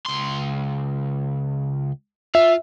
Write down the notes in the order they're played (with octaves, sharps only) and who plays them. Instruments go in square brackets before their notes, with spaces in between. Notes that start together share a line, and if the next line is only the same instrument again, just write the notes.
[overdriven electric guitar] C#2 C6
[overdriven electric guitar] F4 [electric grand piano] E5